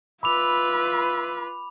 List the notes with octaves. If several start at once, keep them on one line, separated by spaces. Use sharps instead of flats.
F4 B4 E5 B5 D6 F7